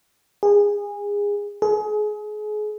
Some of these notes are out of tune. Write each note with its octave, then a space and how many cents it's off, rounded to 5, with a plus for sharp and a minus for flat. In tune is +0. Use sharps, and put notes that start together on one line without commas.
G#4 -25
G#4 +30